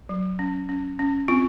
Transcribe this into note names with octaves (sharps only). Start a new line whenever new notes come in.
F#3
C#4
C#4
C#4
C4 F4